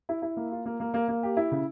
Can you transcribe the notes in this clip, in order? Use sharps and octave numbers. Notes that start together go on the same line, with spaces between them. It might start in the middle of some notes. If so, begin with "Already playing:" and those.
E4
E4
A#3
F4
A#3
A#3
A#3
A#3
G4
E4
C#3